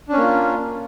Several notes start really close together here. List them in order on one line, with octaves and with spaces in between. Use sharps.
D4 C#4 A#3 F4